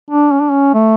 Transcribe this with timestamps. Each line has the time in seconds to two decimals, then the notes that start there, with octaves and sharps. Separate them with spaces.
0.10 D4
0.31 C#4
0.40 D4
0.51 C#4
0.74 A3